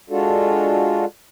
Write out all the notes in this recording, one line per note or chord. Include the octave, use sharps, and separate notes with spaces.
G#3 D4 F4 F#4 A4